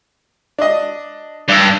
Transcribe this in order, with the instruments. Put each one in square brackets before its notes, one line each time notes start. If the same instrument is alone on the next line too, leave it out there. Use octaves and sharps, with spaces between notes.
[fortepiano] D4 D#5
[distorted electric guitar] G2 [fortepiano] D5 E6